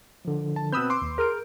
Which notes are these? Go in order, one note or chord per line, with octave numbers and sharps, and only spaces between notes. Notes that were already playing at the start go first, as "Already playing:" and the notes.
D3 F3
A5
B2 C4 B4 B5 D#6 E6 F#6 G6
C6 D6
D#2
G#4 A#4 F6 D7